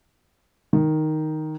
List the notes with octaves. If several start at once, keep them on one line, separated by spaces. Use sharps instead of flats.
D#3